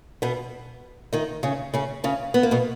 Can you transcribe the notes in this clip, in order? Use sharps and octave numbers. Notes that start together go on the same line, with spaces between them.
B2 B3
D#3 D#4
C#3 C#4
C#3 C#4
C#3 C#4
B3
A#3
B2 B3